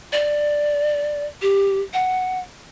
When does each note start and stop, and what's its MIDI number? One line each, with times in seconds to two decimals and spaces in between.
0.13 1.26 74
1.42 1.81 67
1.94 2.39 78